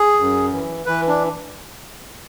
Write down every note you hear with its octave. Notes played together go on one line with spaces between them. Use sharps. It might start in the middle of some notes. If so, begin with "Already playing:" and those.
Already playing: G#4
F#2
E3
E3 B4
D4